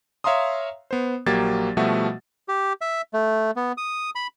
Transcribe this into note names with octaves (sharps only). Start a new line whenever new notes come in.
C#5 E5 F5 A#5 C6 D#6
B3 C5
A#1 F#3 A#3 G4 G#6 A6
B2 F3 G3 A3 F#4 E5
G4
E5
A3
B3
D#6
B5